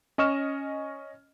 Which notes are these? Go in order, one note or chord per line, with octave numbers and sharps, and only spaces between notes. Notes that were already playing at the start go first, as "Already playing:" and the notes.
C#4 D#5 C#6 F6 E7